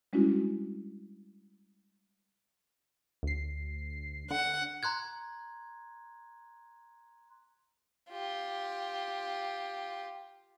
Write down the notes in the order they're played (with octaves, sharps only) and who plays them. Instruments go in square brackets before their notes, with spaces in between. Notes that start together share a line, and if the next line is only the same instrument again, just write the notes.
[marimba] G3 G#3 C#4 D4 E4 F#4
[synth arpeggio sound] D2 C7
[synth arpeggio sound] D3 [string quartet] F#5
[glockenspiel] A#5 C6 F#6 G#6
[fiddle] F4 G4